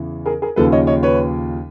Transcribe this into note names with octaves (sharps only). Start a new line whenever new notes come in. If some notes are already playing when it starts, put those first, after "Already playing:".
Already playing: E2 C#3 E3
G#4 A#4
G#4 A#4
D#2 C#3 F3 A4 B4
C#5 D#5
C#5 D#5
B4 C#5